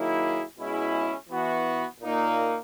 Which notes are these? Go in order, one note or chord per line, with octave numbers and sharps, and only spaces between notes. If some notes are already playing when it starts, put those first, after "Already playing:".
Already playing: D#3 F#3 A#3 E4 G#4
B2 G#3 C#4 E4 G#4
E3 B3 F#4
A#2 A#3 D#4